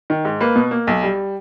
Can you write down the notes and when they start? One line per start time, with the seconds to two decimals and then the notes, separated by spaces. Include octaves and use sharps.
0.10 D#3
0.25 G#2
0.40 A#3 B4
0.56 B2
0.71 A#3
0.87 B1
1.03 G3